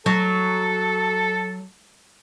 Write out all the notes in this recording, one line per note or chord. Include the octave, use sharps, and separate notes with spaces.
F#3 A4